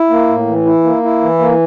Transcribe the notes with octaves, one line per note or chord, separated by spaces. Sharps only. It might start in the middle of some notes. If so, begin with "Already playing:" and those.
Already playing: E4
A#3
A2
E3
E4
A#3
E4
E3
A#3